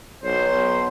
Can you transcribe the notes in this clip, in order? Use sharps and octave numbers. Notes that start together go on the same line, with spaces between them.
B1 C5 C#5